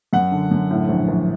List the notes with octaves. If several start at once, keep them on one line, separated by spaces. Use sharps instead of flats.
F#2 F#5
D3
F#2
A2
A#1
A#1